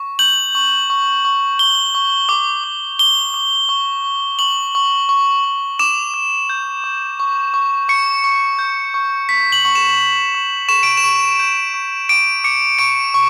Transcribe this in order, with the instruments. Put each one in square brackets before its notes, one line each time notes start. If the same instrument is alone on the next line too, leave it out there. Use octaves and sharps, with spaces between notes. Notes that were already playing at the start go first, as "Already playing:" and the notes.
Already playing: [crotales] C#6
G6 F#7
C#6
C#6
C#6
C#6 G7
C#6
D6
D6
D6 G7
D6
C#6
C#6
C#6 F#7
C#6
C#6
C#6
D6 E7
D6
G6
C#6
C#6
C#6
C#6 C#7
C#6
G6
C#6
C#6 B6
F#7
C#6
E7
C#6
C#6
C#6 E7
D7
E7
C#6
G6
C#6
D6 D7
D6 C#7
C#6 D7
C#6